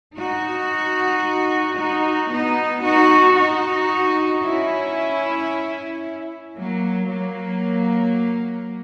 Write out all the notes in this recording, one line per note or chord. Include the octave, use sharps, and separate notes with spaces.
D#4 F#4
D#4 F#4
B3 D#4
D#4 F#4
D#4 F#4
C#4 E4
F#3 A#3
F#3 A#3